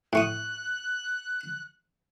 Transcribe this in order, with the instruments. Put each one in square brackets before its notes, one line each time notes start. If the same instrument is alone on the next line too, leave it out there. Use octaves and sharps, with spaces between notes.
[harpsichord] A2 C#6 D#6 [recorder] F#6